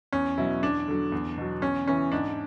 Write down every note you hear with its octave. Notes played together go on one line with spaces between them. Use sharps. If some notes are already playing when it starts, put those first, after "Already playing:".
E2 C#4
B2 F#3 E4
E2 D4
D3 F#3
E2
B2 F#3
E2 C#4
C#3 E3 C#4
G#2 D4